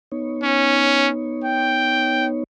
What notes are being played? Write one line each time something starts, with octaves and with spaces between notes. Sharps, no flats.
B3 D#4 C#5
C#4
G5